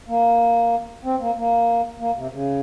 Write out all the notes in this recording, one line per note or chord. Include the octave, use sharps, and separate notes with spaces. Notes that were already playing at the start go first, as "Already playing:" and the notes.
A#3
C4
A#3
A#3
A#3
C3
C#3